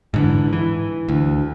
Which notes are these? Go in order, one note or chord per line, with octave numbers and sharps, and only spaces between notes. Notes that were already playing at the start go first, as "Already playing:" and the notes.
G#2 D3 E3
E3
D2